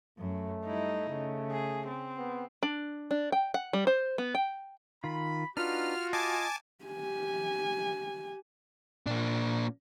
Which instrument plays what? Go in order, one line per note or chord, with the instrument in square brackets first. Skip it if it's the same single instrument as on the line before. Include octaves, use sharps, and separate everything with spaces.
[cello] F#2 [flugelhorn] A3
[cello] G3 E4 [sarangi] D#4
[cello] C#3 [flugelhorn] A3
[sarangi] G#4
C4
[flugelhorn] B3
[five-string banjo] D4
D4
G5
F#5
G3
C5
B3
G5
[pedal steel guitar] D#3 F4 [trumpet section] B5
[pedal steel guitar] D4 D#4 B4 [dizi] F4 [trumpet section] F#4 [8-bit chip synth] F6
[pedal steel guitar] D#5 [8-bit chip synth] G#5 A5 D6
[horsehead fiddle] G4 G#5
[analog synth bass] A#2 [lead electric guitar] A#3 D4